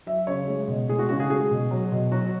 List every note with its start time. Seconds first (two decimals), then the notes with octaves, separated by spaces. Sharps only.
0.07 F#3 E5
0.27 C#3 C#5
0.48 G#3
0.68 B2
0.89 G#3 G#4
0.99 F#4
1.09 C#3 F#4
1.20 G#4
1.30 G#3 G#4
1.51 B2
1.71 F#3
1.92 B2
2.12 F#3 F#4